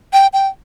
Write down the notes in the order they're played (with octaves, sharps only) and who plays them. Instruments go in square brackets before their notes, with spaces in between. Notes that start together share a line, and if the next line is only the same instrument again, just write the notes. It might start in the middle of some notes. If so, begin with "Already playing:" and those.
[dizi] G5
G5